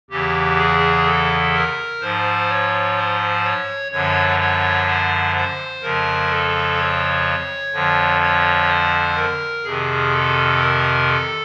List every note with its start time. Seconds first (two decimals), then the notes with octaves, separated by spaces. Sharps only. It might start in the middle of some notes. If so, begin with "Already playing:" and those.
0.10 E2 C#3 E3 G4
0.58 G#4
1.06 A4
1.53 A#4
2.01 G#2 F3 C5
2.49 C#5
2.97 C5
3.44 C#5
3.92 F#2 D3 F3 C#5
4.39 C#5
4.87 C5
5.35 C5
5.82 F2 C#3 F3 A#4
6.30 A4
6.78 C#5
7.73 F2 D3 F3
8.21 C#5
8.69 C5
9.16 A#4
9.64 F2 C3 D#3 G#4
10.12 A4
10.60 A#4
11.07 A4